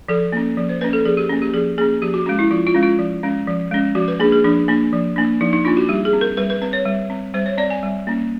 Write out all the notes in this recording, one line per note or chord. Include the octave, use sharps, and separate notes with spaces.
F3 A4
A#3 C#4
F3
C5
A#3 C#4 B4
A4
F3 G#4
G4
A#3 C#4
G4
F3 G#4
A#3 C#4 G#4
F3 G4
F#4
G#3 C#4 F#4
E4
F3 F4
F4
G#3 C#4
F4
F3
G#3 C#4
F3
G#3 C#4
F3 F#4
B4
A#3 D4 G#4
G#4
F3 D4
A#3 D4
F3
A#3 D4
F3 D#4
D#4
A#3 D4 F4
F#4
G3 G4
G#4
C4
A#4
G3 B4
B4
C4 B4
C#5
G3
C4
G3 C5
C#5
C4 D5
G#5
G3
A#3 C#4